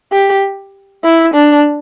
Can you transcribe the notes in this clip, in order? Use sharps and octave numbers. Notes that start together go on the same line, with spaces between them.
G4
E4
D4